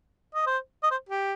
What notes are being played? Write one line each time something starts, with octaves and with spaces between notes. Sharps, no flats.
D#5
C5
D#5
C5
G4